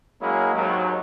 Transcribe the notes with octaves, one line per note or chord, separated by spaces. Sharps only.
F#3 G#3 A#3 C#4 E4 G#4
D#2 G#2 F#3